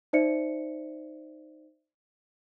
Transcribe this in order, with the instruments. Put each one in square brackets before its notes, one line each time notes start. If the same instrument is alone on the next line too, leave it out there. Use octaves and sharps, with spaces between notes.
[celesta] D#4 C5 D5 E5 C#7